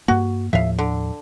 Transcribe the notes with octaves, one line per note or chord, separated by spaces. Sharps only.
G2 A#3 F#4
D#2 A2 F3 E5 F5
D3